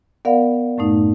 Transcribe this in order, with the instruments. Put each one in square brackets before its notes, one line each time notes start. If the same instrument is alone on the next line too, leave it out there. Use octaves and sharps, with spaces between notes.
[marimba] B3 A#4 D5 F5 F#5
F#2 A2 A3 D#4